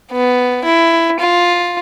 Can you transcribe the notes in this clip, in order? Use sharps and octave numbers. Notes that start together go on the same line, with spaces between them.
B3
E4
F4